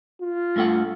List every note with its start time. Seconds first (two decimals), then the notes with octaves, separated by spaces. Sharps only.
0.21 F4
0.56 G2 A3 F#5